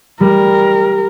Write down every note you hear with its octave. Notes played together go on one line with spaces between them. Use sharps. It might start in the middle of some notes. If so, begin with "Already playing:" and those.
G3 A#4